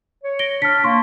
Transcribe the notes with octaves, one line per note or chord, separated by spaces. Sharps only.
C#5
A#6 D7 G7
D4 F6 B6
A#3 C6 C#6